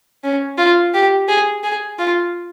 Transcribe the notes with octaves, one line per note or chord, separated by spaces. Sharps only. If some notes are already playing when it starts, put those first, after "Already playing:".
C#4
F4
G4
G#4
G#4
F4